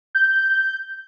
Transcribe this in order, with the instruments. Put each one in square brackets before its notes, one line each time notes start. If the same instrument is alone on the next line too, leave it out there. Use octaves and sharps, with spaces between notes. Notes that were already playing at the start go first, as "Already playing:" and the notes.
[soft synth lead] G6